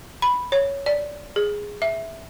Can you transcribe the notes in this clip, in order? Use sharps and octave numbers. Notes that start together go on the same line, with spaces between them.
B5
C#5
D5
G#4
E5